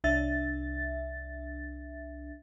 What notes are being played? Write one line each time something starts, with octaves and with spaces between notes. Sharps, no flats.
C2 D4 E5 A6